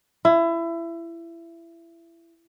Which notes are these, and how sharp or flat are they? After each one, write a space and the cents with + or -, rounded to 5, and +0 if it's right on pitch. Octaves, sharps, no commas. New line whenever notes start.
E4 +25